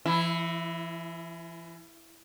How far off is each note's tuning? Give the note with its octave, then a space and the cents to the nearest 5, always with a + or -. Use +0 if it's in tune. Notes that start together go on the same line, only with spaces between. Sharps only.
E3 +40 E4 +0